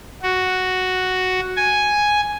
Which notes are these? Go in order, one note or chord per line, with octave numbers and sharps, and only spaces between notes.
F#4
G#5